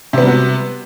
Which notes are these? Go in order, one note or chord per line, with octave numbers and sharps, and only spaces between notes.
C3 G3 B3 F#4